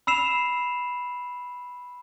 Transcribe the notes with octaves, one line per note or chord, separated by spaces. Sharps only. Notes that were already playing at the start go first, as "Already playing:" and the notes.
B5 E6 C7 E7 F7